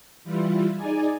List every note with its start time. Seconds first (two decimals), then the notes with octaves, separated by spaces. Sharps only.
0.24 E3 G3 E4 F4
0.75 D#4 G#4 D5 G#5